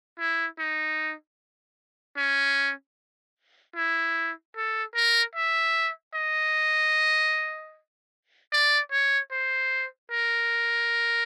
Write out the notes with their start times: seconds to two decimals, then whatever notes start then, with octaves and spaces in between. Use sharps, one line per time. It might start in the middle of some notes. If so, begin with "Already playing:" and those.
0.18 E4
0.59 D#4
2.17 C#4
3.76 E4
4.56 A4
4.95 A#4
5.35 E5
6.14 D#5
8.52 D5
8.91 C#5
9.31 C5
10.11 A#4